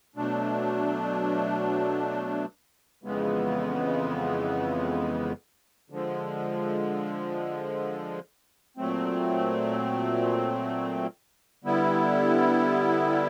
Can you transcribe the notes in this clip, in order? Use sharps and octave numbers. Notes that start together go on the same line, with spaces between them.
B2 F#3 A3 D4
F2 C#3 E3 G#3 B3
D3 F3 G#3
A#2 F#3 A3 C4
D3 G3 B3 E4